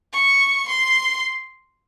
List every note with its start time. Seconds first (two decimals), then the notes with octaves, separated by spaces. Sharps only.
0.13 C#6
0.68 C6